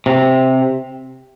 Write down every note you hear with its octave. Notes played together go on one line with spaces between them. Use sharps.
C3